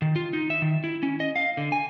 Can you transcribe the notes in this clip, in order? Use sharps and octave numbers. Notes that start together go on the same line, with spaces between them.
D#3
F4
D#4
E5
D#3
E4
C#4
D#5
F5
D3
G#5